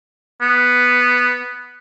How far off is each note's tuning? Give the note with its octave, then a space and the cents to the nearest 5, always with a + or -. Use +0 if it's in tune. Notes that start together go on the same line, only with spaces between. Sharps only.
B3 +0